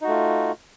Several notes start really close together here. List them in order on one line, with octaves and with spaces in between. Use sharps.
D#4 F#4 A3 F4